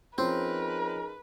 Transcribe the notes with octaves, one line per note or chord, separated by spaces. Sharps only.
F3 C4 C#4 D#4 G#4 A#4 B4